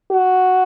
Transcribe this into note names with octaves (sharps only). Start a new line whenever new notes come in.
F#4